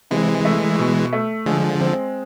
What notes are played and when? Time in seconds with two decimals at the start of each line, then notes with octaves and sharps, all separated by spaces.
0.11 C3 E3 G#3
0.45 A3
0.79 B2
1.13 A3
1.46 D3 F3 G#3
1.80 C4